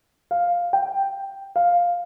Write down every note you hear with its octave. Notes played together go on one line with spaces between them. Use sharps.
F5
G5
F5